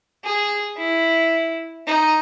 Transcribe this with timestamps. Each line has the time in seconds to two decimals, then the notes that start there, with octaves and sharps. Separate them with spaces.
0.24 G#4
0.78 E4
1.87 D#4